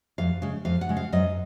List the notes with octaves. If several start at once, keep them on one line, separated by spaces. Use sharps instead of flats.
F2 F5
C#3 G#3
F2 F5
F#5
C#3 G#3
F5
F#2 D#5